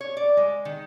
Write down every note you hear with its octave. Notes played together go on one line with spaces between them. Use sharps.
C#5
D5
G#3
D#3